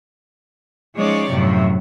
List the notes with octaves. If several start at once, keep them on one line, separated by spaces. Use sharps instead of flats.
F3 G#3 C#4 D#4 C#5 D5
F#2 A2 C3 F3